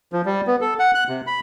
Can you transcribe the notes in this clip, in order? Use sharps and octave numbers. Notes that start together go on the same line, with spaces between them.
F3
G3
B3
A4
F#5
F#6
C3
B5